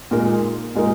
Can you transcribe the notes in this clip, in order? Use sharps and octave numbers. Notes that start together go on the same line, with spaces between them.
A#2 G#3 D#4 A#4
A#2 G#3 D#4 A#4